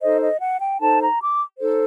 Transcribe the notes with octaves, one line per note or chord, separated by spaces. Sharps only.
D#4 A4 C5 D#5
D#5
F#5
G5
D#4 A4 C5 A5
A#5
D6
D#4 A4 C5